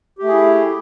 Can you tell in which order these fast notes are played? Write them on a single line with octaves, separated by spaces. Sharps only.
G4 A3 G#4 E4